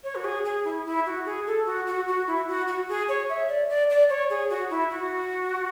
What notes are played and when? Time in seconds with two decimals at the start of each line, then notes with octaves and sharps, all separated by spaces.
0.04 C#5
0.15 F#4
0.24 G#4
0.45 G#4
0.65 E4
0.86 E4
1.06 F#4
1.26 G#4
1.47 A4
1.66 F#4
1.87 F#4
2.07 F#4
2.27 E4
2.48 F#4
2.67 F#4
2.89 G#4
3.08 C#5
3.29 E5
3.49 D5
3.69 D5
3.90 D5
4.09 C#5
4.30 G#4
4.50 F#4
4.70 E4
4.90 F#4